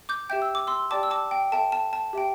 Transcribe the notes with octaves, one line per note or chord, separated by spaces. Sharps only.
D6 G6
G4 E5 G5 G6
E6
D6
C6 E6
G4 D5 G5 A5 D6
E6
A5 D6
G5
A4 E5 G5 A5
A5
A5
G4 E5 G5